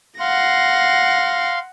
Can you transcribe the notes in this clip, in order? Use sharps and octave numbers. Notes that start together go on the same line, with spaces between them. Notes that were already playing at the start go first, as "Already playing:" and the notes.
F5 F#5 C6 A#6